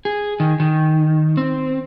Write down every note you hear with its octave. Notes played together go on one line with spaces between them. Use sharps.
G#4
D#3
D#3
C4